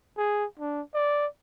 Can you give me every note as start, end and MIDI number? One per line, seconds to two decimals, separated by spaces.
0.18 0.45 68
0.59 0.82 62
0.94 1.26 74